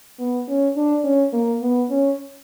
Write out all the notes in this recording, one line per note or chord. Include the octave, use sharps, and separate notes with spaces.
B3
C#4
D4
C#4
A#3
B3
C#4